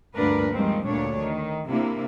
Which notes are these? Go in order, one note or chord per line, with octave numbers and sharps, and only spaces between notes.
D2 G2 A#2 D4 A#4 B4
D#3 F3 G3 G#3 C4
D2 A#2 A3 D4 C#5
D#3
C3 A#3 D4 E4